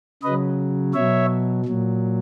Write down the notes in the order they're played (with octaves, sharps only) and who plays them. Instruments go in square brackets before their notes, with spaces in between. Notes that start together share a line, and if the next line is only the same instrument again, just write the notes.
[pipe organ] C#3 F#3 B4 D#5
B2 F#3 C#5 E5
A#2 F#3